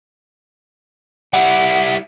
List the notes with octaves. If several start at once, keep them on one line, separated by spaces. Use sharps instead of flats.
G3 E4 F#5